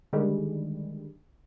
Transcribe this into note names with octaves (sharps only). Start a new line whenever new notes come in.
D3 D#3 G3 G#3